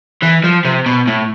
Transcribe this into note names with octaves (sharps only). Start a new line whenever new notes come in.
E3
F3
C3
B2
A2